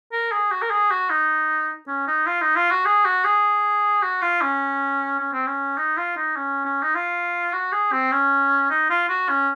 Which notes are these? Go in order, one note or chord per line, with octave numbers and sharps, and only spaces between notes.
A#4
G#4
F#4
A#4
G#4
F#4
D#4
C#4
D#4
F4
D#4
F4
F#4
G#4
F#4
G#4
F#4
F4
C#4
C#4
C4
C#4
D#4
F4
D#4
C#4
C#4
D#4
F4
F#4
G#4
C4
C#4
D#4
F4
F#4
C#4